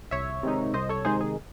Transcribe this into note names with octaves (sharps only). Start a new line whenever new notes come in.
C2 C#5 E5
C3 D#3 G#3 D#4
C2 C5 D#5
A4 C#5
C3 D#3 G#3 D#4 G#4 C5
G#4